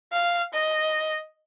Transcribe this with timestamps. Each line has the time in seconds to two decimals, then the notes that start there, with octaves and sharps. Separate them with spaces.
0.12 F5
0.53 D#5